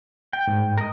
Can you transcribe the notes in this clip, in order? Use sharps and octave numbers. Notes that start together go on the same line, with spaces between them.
G5
G#2
A#4 D#5